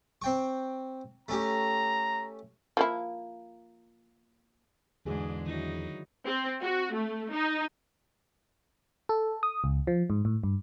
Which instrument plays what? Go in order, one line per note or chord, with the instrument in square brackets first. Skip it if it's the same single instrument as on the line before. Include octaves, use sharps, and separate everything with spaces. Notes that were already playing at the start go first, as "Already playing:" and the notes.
[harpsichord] C4 G5 C#6
[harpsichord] A3 C#4 G4 [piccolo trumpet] A#5
[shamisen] F3 A#3 E4
[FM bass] E2 [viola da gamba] G#2 D4 [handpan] D3 F#4 G#4
[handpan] D#3 E4 [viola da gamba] F#3 D#4
[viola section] C4
F#4
A3
D#4
[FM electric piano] A4
D#6
C#2
F3
G#2
A2
G2